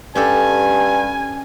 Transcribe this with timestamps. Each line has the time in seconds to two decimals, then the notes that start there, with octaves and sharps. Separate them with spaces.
0.15 G2 C#4 G4 A4 G#5